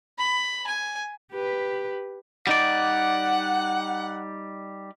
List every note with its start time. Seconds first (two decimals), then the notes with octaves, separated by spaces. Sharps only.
0.18 B5
0.67 G#5
1.32 G4 B4
2.47 G3 D#4 D5 F#5